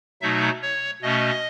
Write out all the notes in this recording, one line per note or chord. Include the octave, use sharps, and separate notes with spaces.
B2 F#3 A3 D#4 E5
C#5
B2 A3 C#4 D#5